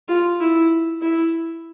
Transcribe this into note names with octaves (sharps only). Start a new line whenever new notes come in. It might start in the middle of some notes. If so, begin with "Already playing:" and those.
F4
E4
E4